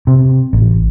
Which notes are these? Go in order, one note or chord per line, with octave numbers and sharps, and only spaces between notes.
C3
A1